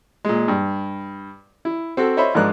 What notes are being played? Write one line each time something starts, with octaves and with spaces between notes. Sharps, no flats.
A#2 G#3
G2
E4
C4 F#4 A4
C5 C#5 D#5 E5 B5
G#2 F3 G#3 D4 A#4 F#6